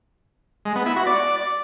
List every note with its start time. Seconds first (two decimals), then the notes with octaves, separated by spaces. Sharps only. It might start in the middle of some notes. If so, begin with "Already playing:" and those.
0.65 G#3
0.76 B3
0.86 E4
0.96 F#4
1.06 D5